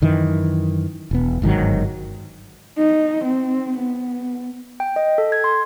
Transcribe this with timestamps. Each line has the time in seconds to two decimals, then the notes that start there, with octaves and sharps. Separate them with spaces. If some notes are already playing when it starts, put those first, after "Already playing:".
0.02 F#2 D#3 E3
1.11 E1 B3
1.42 G1 G#2 D#3 F#3
2.78 D#4
3.24 C4
3.78 B3
4.80 G5
4.96 D#5
5.18 A4
5.32 G#6
5.44 C6